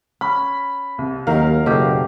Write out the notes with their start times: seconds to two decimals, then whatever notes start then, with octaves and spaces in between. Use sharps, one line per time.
0.21 C#4 B5
0.98 C2
1.27 D#2 D#3 F#3 A#4 F5
1.66 F#1 B2 A3 G4